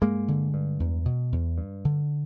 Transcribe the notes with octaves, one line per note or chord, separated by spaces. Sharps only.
G2 G#3 A#3
D3
G2
E2
B2
E2
G2
D3